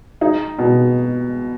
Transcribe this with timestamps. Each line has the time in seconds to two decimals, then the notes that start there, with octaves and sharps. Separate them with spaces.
0.21 D#4
0.59 B2